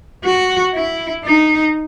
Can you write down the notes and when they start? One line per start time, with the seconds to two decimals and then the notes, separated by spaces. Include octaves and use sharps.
0.25 F#4
0.74 E4
1.24 D#4